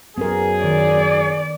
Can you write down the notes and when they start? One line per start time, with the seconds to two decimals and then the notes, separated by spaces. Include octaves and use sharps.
0.18 F#2 B3 G#4 A#4
0.64 D#3 D5